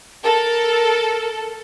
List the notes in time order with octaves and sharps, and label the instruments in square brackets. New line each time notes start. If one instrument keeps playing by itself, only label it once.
[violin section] A4 [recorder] A#4